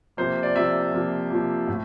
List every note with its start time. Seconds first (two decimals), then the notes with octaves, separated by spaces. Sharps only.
0.17 C3 F3 A#3 C5
0.43 D5
0.56 C3 F3 A#3 E5
0.92 C3 F3 A#3
1.30 C3 F3 A#3
1.68 A2